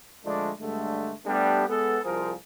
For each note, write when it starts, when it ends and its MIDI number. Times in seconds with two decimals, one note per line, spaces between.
0.25 0.50 50
0.25 0.50 53
0.25 0.50 56
0.25 0.50 57
0.25 0.50 62
0.60 1.12 43
0.60 1.12 50
0.60 1.12 56
0.60 1.12 57
1.25 1.63 55
1.25 1.63 57
1.25 1.63 59
1.25 1.63 62
1.25 1.63 67
1.67 1.98 56
1.67 1.98 59
1.67 1.98 69
2.04 2.33 36
2.04 2.33 53
2.04 2.33 65
2.04 2.33 68
2.04 2.33 70
2.04 2.33 72